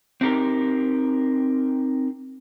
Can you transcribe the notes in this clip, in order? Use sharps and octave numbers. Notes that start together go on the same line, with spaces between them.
C4 D#4 G4 A#4